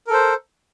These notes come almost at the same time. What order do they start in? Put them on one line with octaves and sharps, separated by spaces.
A#4 A4 C5